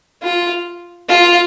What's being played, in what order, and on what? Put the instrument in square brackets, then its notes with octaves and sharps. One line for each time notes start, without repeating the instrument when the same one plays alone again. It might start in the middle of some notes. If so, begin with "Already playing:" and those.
[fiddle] F4
F4